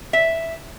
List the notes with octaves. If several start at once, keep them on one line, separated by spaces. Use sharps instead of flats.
E5